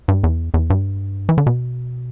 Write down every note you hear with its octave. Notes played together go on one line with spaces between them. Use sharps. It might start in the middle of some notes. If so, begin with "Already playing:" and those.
G2
E2
E2
G2
E3
D3
B2